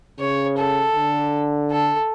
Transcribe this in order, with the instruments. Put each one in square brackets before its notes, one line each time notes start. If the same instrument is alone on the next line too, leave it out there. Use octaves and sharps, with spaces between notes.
[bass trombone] C#3 [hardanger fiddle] C#5
[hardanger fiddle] A4
[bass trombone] D3
[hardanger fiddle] A4